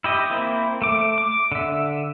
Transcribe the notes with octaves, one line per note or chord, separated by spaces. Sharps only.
E4 G4 D#5
A#3 C4 E4
A3 D6
D6
D3 E5